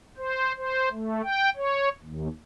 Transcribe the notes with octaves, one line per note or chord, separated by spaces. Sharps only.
C5
C5
A3
G5
C#5
D#2